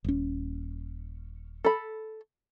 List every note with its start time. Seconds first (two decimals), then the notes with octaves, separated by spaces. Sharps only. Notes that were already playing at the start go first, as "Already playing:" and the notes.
0.04 D#1 C#4
1.65 A4 B5